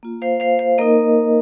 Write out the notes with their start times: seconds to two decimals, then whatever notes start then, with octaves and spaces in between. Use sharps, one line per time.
0.03 A#3 F4
0.22 C5 F5
0.40 C5 F5
0.59 C5 F5
0.78 A#3 D#4 A#4 D#5